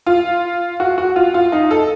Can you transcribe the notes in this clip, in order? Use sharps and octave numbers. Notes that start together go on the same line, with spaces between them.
F4
F#4
F#4
F4
F4
D#4
A4